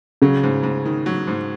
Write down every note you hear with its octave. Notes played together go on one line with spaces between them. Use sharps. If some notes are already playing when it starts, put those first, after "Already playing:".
C#3 F#3
G#2
G#2
D#3
F#3
G#2